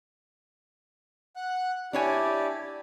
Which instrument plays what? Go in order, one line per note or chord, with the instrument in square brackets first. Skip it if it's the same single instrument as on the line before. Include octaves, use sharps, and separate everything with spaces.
[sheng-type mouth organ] F#5 F#6
[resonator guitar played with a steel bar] D4 C#5 G#5 [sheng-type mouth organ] E4 G4 D5